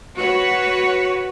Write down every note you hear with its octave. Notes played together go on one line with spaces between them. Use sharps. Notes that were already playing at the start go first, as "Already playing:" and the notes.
F#4 B4 C#5